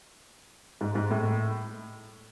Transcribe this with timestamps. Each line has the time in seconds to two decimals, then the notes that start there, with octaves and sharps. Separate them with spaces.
0.81 G#2
0.95 G#2
1.10 A2